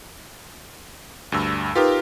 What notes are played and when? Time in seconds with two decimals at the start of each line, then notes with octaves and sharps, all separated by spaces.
1.32 D2 G2 E6
1.75 D#4 F4 G4 A#4 B4